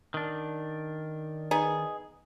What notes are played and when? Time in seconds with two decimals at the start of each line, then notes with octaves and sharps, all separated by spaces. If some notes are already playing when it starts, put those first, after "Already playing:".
0.14 D#3 D4
1.51 B3 D#4 G#4